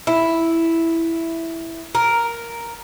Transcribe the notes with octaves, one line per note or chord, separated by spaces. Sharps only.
E4
A#4